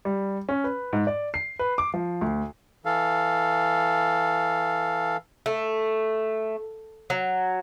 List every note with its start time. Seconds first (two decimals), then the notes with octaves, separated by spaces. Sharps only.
0.05 G3
0.49 C#4
0.64 B4
0.93 G#2
1.07 D5
1.34 C7
1.59 B4
1.78 D6
1.94 F3
2.21 D2
2.85 E3 A4 F5
5.46 A3
7.10 F#3